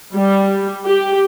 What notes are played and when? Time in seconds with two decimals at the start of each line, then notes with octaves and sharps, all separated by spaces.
0.13 G3
0.86 G4